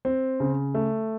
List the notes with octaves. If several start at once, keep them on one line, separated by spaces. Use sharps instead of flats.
C4
C#3
A3